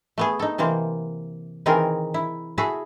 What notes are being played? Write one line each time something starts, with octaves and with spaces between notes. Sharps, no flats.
A3 B3 G#4
D#4 A4
C3 E3 A#3 C5
D#3 E3 C4 G#4 A#4
E4
E4 F#4 G#4 A4 E5